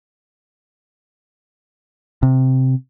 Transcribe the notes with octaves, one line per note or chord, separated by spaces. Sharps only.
C3